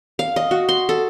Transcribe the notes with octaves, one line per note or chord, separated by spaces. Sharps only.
F5
D#5
F#4
C6
A4